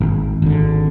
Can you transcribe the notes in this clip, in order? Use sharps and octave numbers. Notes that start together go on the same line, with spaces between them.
G#1
G#1 D3